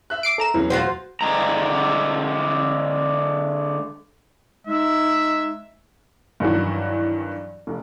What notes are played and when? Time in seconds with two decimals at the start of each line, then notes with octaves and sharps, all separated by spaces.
0.10 E5 F#6
0.23 D6 C7 D7
0.38 A4 A#5 E7
0.54 E2 C#3 F#3 E4
0.70 F4 F#4 C5
1.21 D3 G#3 A#5
4.67 G#3 D#4 E5
6.40 G2 D#3 E3 F#3 F#4
7.67 F1